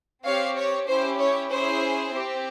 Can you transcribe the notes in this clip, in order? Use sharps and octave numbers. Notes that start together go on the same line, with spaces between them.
C4 G4 C#5 F5
C#5
C#4 E4 G4 C5
C#5
C#4 E4 G#4 C5
C4 G4